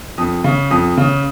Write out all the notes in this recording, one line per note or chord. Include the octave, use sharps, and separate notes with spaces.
F2 D#6
C#3
F2 D#6
C#3